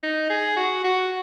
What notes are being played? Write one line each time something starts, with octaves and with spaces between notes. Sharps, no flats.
D#4
G#4
F#4
F#4